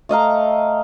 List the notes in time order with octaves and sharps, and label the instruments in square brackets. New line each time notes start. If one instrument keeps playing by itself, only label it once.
[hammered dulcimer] A3 D#5 F5 A#5